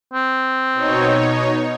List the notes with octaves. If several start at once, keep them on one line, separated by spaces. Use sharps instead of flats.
C4
B2 D#4 C#5